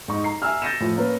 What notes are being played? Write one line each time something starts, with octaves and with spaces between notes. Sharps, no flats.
G#2 D#4 C#6
A#5 C7
E5 G#5 A#5 E6 F6
G6 A6 A#6 C#7 D#7 E7
A2 F3
A#3 C#4 A#4 B4